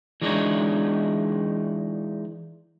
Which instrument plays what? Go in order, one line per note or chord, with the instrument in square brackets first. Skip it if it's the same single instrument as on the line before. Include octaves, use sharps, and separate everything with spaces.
[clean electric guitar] E3 G#3 D4 D#4 F4 C#5